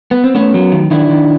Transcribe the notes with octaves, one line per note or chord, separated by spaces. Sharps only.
B3
C4
A3 B3 C#4
F#3
D#3
D#3 D4 E4
D#3